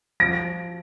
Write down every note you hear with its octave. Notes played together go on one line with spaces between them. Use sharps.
F3 A#6 D7